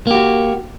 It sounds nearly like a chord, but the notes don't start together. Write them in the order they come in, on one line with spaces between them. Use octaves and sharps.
A#3 G4 F#4